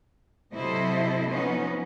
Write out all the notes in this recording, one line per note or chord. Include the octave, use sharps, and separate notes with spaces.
C3 F#3 E4 A4 C5 D#5
F3 B3 C#4 D#4